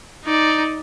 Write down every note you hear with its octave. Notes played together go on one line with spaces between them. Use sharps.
D#4 D5